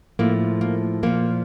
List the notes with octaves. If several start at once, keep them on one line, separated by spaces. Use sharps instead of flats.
A2 F3 A#3
A#3
A#2 F3 A#3